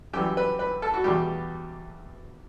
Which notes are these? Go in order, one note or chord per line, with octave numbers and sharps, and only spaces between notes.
F#2 E3 G3 G4
B4
B4
A4
F#4
E2 B2 G3 G4